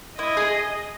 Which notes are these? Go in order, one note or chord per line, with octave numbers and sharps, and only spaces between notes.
E4 D#5
G#4